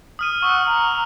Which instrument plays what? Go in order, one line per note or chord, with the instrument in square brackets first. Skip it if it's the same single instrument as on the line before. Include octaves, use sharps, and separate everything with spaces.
[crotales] D#6 F6 D#7
[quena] F#5 [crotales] C#6 D#6 E6
[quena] A#5